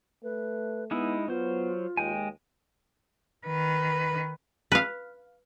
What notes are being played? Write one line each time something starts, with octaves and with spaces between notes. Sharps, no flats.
A3 B4
G#3 B3 D#4 E4
F#3 B3 F4 C5
D#2 G#3 G5 G#5
D#3 B4
B4 F5